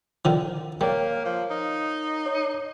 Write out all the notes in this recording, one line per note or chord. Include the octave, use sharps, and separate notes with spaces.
D3 D#3 F3
G3 A#3 A#4 C#5 F5
F3
D#4
C#5